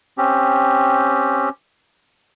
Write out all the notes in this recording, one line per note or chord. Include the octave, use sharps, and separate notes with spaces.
C4 C#4 G4